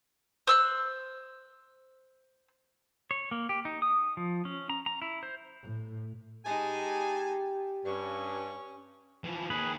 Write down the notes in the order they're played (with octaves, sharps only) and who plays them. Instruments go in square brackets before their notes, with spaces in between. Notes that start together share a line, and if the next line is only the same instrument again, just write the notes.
[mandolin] C5 E6 F#6
[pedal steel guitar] C#5
A#3
G4
D#4
D#6
F3
C#4
A#5
A#5
E4
C5
[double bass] A2
[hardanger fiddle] G#3 D#4 [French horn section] G4 [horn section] G#5 A5
[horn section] G2 [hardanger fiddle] C#4 C#6
[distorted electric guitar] E3 F3
[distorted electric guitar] D#2 [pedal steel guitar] G#4 B4